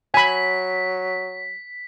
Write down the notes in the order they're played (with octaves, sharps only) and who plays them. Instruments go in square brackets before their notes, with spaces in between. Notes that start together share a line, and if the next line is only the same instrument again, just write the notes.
[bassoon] F#3 [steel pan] G#5 B5 [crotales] B6